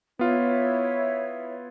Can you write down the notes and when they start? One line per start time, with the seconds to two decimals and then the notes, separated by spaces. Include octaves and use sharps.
0.19 B3 E4 F4 C#5 E5